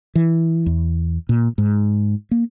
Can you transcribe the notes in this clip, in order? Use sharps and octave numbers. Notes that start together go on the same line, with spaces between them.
E3
E2
A#2
G#2
A#3